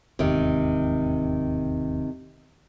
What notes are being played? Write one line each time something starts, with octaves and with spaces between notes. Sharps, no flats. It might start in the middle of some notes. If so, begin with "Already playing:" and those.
E1 D#2 G#2 C3 D#3